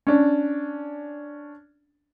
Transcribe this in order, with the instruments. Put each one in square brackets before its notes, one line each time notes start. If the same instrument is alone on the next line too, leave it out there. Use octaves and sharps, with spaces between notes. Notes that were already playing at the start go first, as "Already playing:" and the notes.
[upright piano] C#4 D4